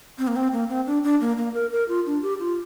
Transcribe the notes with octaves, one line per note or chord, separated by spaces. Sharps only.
C4
A#3
C4
A#3
C4
D4
D4
A#3
A#3
A#4
A#4
F4
D4
G4
F4